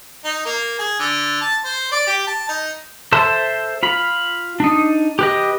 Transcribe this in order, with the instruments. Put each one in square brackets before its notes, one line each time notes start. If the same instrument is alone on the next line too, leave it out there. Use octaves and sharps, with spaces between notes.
[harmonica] D#4
A#3
G#4
D3
A5
C5
D5
G4
A5
D#4
[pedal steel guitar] A4 C5 E5 A5 C6
F4 B5
D4 D#4
G4 B4 D#5